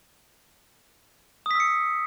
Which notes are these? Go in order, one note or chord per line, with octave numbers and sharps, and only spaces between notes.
D#6 E6 B6 C#7